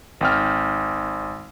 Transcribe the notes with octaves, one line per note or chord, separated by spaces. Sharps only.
G#1 G5 F6